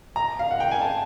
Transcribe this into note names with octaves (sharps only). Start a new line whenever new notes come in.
A#5
F5
F#5
G5
G#5
A5